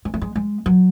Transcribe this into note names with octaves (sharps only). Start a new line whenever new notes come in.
G#3
A3
G#3
G#3
F#3